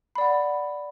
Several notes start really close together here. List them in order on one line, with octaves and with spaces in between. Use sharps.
B5 D5 F#5